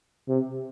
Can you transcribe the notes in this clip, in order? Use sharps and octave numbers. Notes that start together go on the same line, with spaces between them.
C3